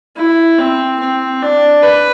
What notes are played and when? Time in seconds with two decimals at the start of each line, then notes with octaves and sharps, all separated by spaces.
0.17 E4
0.59 C4
1.00 C4
1.42 D4
1.83 B4